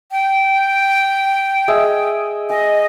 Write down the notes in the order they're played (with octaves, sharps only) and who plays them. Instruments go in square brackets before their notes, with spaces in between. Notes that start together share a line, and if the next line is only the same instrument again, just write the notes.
[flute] G5
[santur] G#4 D#5 E5
[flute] D#5 [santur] G#5